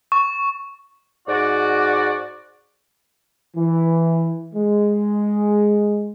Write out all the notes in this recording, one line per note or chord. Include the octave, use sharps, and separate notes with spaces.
C#6
G#2 F#4 D5
E3
G#3